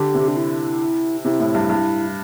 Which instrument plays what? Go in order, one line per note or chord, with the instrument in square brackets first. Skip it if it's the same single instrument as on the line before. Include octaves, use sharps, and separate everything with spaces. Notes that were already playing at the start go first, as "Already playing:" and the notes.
Already playing: [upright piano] D3 [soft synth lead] G4
[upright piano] C3
[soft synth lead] D4
E4
[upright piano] C3 [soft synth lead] E4
[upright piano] A2
G2
G2